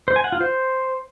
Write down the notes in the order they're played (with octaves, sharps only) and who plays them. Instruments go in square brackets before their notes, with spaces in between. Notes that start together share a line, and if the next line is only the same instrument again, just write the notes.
[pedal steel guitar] C5
G#5
F#5
F4
C5